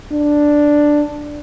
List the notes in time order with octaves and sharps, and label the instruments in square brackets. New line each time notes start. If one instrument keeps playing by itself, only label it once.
[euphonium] D4